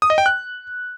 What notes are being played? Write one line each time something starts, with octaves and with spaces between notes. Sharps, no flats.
D#6
D#5
G5
F#6